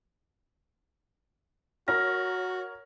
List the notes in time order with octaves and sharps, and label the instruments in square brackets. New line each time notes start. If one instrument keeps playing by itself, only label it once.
[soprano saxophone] F#4 [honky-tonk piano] A#4 C#5 A#6 [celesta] F6